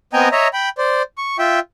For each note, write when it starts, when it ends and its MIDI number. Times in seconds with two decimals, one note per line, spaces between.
0.13 0.29 59
0.13 0.29 60
0.13 0.29 75
0.13 0.29 79
0.13 0.29 80
0.13 0.29 82
0.32 0.48 73
0.32 0.48 75
0.32 0.48 76
0.32 0.48 82
0.53 0.69 79
0.53 0.69 83
0.78 1.02 72
0.78 1.02 74
1.18 1.37 85
1.39 1.59 65
1.39 1.59 76
1.39 1.59 79